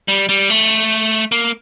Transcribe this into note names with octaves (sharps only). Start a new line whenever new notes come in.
G3
G3
A3
A#3